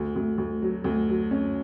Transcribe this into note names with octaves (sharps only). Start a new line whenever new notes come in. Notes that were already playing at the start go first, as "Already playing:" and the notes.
Already playing: D2
D2
D2
F#3
D2
F#3
C#4